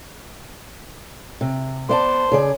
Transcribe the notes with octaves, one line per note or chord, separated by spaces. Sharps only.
C3
B3 C5 D5 A5
C#3 G#4 D5